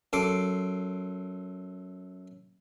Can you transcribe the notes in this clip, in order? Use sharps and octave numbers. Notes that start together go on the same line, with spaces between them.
F#2 A4 C6 D6